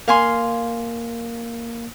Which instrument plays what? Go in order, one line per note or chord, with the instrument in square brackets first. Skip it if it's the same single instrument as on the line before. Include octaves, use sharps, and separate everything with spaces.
[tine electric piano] A#3 [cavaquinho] F5 G#5 C6